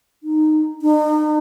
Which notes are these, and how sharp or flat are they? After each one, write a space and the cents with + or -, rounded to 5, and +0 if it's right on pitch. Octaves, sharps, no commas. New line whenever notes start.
D#4 -10
D#4 -40